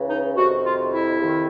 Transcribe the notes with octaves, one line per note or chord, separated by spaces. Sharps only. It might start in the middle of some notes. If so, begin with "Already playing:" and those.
Already playing: C#2 C#3 E3
D#4
F2 C3 D#3 F#4
F4
E4
F2 C3 D#3